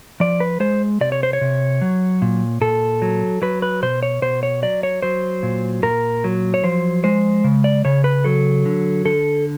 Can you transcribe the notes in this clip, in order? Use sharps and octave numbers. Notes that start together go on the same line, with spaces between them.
F3 D5
B4
G#3 C5
C3 D5
C#5
C5
C#5
C3
F#3
A#2
A#2 A4
F#3
F#3 B4
B4
B2 C5
C#5
B2 C5
C#5
F#3 D5
C#5
F#3 C5
A#2
A#2 A#4
F#3
C#5
F3 C5
G#3 C5
C#3
D5
C#3 C#5
B4
F#3 A4
D3
D3 A4